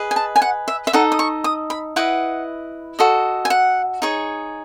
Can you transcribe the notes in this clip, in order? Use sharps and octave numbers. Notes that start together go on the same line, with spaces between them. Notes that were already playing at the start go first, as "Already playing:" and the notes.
Already playing: G#4 B4 D#5
G#5
A5
G#5
F#5
E5
E5
D#4 A4 D#5 F#5
D#6
C#6
D#6
B5
E4 B4 D#5 F#5
F#4 A4 D#5
G#5
F#5
D#4 G#4 C#5